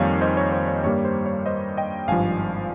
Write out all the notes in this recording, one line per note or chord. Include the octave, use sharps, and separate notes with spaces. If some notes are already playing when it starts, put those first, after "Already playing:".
Already playing: F2 D#3 G3 A#3 C#5 F5 G#5
C5 D#5
C#5
C5
C#5
G2 G3 A#3 C#5
C5
C#5
C5 D#5
D#5 G5
G#1 G2 F3 F5 G#5